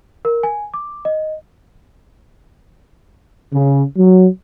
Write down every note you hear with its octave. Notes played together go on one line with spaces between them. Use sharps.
A#4
G#5
D6
D#5
C#3
F#3